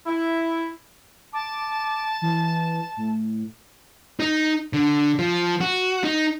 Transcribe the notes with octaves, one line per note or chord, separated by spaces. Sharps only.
E4
A5 D6
E3
A2
D#4
D3
F3
F#4
D#4